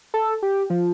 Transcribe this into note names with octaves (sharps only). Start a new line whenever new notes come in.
A4
G4
F3